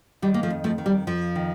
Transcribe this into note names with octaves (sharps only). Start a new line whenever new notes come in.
D#3 G3
A#3
F3 A3
F2
F3 A3
D#3
G3
F2 F3
D#3